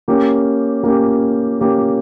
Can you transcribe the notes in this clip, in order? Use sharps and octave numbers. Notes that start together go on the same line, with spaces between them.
A#3 C#4 G4
A#3 C#4 G4
A#3 C#4 G4